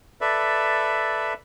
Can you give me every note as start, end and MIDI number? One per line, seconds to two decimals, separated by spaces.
0.21 1.33 69
0.21 1.33 71
0.21 1.33 74
0.21 1.33 76